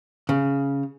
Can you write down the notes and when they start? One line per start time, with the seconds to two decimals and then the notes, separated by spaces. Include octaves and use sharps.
0.29 C#3